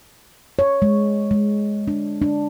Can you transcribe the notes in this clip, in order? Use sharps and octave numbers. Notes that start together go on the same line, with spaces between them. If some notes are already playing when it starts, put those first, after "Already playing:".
C#5
G#3
G#3
D4
D4